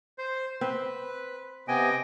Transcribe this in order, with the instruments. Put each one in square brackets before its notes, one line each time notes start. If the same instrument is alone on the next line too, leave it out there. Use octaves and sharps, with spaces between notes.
[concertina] C5
[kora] C4 [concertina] B4
[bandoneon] C3 B3 G#5 [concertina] D#5 G5